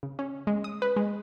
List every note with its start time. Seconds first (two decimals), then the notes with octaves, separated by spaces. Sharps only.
0.03 C#3
0.19 C#4
0.47 G#3
0.64 D#6
0.82 B4
0.96 G#3